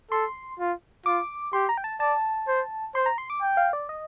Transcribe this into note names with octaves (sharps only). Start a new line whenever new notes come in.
A4 C6
F4
F4 D6
G4 C6
A#5
G5
A5
D5 A5
C5
C5 C6
A#5
C6
D6
G5
F5
D5
D#5